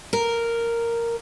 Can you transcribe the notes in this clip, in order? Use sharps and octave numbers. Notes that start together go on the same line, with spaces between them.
A#4